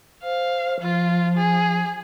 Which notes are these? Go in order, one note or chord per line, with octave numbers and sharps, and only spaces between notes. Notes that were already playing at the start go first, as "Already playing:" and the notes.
C5 F5
F3 F4
G#4